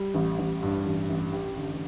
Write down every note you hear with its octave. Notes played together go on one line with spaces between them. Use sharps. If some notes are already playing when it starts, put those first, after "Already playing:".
Already playing: G3
A1
A1
G2
A1
A1
G4
D3